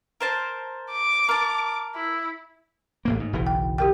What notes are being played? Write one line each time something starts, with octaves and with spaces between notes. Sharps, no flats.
A#4 C5 A5
D6
A#4 A5
E4
A1 A2 A#3
G#2
F#1 B1 E3
G5
G4 A#4 G5